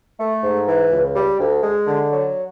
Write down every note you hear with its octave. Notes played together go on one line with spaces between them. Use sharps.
A3
G#2
E3
C#2
G3
D2
G#3
D3
F#3